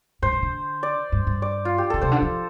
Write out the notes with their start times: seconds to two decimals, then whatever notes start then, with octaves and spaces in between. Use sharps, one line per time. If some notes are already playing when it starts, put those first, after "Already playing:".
0.22 G2 C5
0.33 G2
0.43 D3
0.83 D5
1.12 G2
1.27 G2
1.42 D5
1.65 F4
1.78 G4
1.90 D3 A4
2.01 C3 C5
2.11 D3
2.22 F3